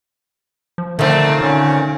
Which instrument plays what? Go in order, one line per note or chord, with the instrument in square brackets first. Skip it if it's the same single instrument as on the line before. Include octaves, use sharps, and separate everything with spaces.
[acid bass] F3
[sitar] A#2 C4 [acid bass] D3 [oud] D#3 D#4 [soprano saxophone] A3
[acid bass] D3 [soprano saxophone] C#4